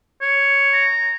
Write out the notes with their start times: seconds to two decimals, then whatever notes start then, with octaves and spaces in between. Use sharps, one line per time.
0.22 C#5
0.74 A#5